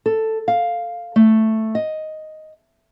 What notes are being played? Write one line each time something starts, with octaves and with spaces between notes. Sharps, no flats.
A4
F5
A3
D#5